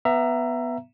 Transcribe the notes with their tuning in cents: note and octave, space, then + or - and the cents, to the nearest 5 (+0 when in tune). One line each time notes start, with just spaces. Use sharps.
B3 +0 E5 +20 A#5 +0